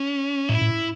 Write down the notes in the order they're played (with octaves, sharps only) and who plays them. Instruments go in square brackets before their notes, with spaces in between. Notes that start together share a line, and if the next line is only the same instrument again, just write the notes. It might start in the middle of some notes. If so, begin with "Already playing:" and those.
Already playing: [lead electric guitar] C#4
[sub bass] A2 [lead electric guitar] E4
[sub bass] A2